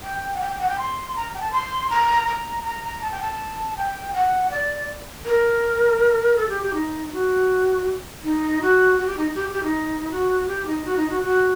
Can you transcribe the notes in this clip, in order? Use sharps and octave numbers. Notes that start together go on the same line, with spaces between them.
G5
F#5
G5
G5
F#5
G5
C6
A#5
G5
A5
C6
A#5
A#5
A#5
A#5
A5
G5
A5
G5
F#5
D5
A#4
A4
G4
G4
D#4
F#4
D#4
F#4
F#4
G4
D#4
G4
G4
D#4
F#4
G4
D#4
F#4
D#4
F#4
F#4